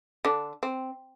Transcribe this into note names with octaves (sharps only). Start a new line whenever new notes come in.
D3 D4
C4